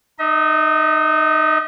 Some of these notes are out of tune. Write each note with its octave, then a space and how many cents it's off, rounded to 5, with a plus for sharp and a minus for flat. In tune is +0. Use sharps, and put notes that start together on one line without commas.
D#4 -25 D#5 +40